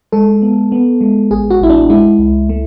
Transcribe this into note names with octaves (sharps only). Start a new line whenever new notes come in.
G#3 A4
B3
B3
G#3
A1 G#4
F#4
A1 E4
D4
G#3 E4
C#2
A3